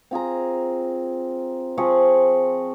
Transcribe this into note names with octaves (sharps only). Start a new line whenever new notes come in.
C4 F4 G#4 A#5
F3 C4 G#4 C#6